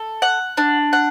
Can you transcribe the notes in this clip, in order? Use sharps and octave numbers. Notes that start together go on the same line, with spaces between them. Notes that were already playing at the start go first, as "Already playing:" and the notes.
Already playing: A4
F#5
D4
F#5